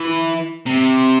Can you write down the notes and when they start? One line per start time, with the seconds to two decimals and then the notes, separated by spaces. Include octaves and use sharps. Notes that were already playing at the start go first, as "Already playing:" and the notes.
Already playing: E3
0.66 C3